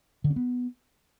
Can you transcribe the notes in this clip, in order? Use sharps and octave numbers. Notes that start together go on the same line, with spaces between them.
D3
C#4
B3